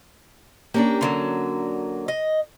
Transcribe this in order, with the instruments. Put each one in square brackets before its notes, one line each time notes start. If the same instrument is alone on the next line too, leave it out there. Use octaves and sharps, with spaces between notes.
[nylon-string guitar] A#3 C#4 D4 [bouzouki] G4
[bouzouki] D3 F3 F#3
D#5